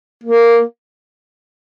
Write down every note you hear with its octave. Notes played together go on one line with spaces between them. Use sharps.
A#3